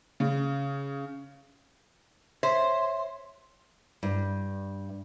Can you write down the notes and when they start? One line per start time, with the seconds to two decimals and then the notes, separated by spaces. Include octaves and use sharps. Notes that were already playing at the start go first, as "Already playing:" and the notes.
0.20 C#3
2.43 C5 C#5 E5
4.03 G2